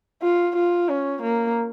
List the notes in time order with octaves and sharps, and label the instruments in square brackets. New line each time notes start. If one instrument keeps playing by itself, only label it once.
[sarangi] F4
F4
C#4
A#3